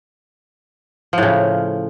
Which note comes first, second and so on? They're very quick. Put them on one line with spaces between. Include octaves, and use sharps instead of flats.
F3 A2 C#3